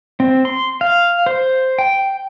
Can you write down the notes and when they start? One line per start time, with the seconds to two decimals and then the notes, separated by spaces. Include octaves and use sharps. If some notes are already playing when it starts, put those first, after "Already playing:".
0.20 C4
0.45 C6
0.81 F5
1.26 C5
1.79 G5